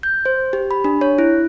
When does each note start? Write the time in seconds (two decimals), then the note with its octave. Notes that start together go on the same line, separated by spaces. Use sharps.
0.03 G6
0.25 C5
0.53 G4
0.71 B5
0.84 D4
1.01 C#5
1.18 E4